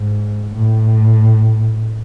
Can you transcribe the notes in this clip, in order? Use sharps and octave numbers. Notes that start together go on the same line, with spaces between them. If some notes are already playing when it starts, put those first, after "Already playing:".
Already playing: G#2
A2